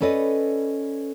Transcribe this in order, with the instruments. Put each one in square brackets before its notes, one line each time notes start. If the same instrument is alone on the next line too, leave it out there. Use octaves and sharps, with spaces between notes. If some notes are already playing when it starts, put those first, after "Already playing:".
[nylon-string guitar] C#4 A4 B4 D5 D#5